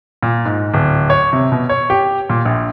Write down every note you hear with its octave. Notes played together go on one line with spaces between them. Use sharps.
A#2
G#2
D1
C#5
C3
B2
C#5
G4
A#2
A#1